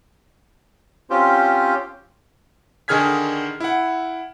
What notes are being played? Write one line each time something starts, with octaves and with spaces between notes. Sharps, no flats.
C4 C#4 F4 G4 C5
D3 D#3 G#4 F6 G#6 B6
E4 F#5